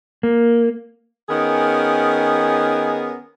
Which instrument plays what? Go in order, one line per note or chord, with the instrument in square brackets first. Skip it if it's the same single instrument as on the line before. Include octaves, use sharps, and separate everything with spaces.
[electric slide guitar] A#3
[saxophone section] D#3 B3 C#4 G#4 A#4